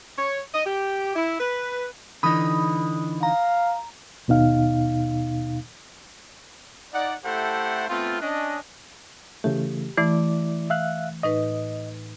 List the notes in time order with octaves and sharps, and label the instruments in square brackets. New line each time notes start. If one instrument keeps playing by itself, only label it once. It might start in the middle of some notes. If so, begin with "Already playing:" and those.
[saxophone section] C#5
D#5
G4
E4
B4
[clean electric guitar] D3 E3 D#4 [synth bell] B5 D#6
[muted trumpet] F5 [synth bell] A#5
[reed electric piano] D#2 B2 D#4 F5
[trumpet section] D#4 D5 F#5
A3 E4 G4 A4 C5 F#5
A3 B3 C4 F4
C#4 D4 D#5
[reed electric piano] C#3 E3 A3 [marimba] G4
[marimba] E3 A3 [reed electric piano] E4 D5 D6
[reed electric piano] E5 F5 F#6
[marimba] A2 D#4 B4 [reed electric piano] D#5